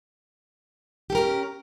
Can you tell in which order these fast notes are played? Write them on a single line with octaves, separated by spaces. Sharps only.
G4 A4 A#4 C#4